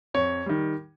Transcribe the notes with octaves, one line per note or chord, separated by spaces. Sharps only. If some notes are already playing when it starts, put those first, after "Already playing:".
F2 C#5
D#3 G3